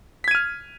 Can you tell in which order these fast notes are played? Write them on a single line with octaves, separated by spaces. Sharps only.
B6 G#6 D#7 F6